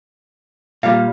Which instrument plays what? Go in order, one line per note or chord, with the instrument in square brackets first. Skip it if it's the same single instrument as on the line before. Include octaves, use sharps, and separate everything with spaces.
[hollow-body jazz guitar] A#2 G3 [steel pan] F5